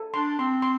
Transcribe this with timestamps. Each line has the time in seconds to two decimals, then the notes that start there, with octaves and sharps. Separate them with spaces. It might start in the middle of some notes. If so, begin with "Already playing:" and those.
Already playing: A4
0.14 D4 C6
0.39 C4 C6
0.62 C6